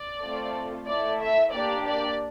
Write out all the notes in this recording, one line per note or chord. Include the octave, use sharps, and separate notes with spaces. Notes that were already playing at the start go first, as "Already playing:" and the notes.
Already playing: D5
A3 C4 F4 A4
A3 E4 A4 D5
E5
A#3 D4 G4 D5
D5